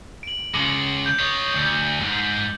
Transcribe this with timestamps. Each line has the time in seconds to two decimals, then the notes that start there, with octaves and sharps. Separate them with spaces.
0.23 D7 F#7
0.54 C#3 G#3 D6 C#7 F#7
1.06 G6
1.19 C#5 D#5
1.54 D2
2.01 G#2